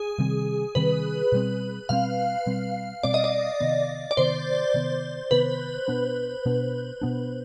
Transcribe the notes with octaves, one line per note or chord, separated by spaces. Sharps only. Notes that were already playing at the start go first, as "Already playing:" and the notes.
Already playing: G#4
C3 D#3 G3 C4
C3 D#3 G3 C4 B4
B2 G3 C4
B2 G3 C4 F5
B2 G3 C4
B2 G3 C4 D5
D#5
D5
C3 D#3 B3
D5
C3 D#3 B3 C5
C3 D#3 B3
C3 D#3 B3 B4
B2 B3 D4
B2 B3 D4
B2 B3 D4